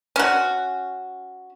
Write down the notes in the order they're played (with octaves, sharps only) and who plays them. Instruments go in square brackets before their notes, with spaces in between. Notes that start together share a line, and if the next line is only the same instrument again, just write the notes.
[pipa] C#4 F#4